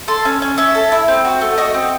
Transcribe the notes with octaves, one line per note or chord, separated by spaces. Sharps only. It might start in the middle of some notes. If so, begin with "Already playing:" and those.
A4 C6
C#4
C#4
C#4 E5
A4
E4
C4
F#4
A3
F#4 D#5
C4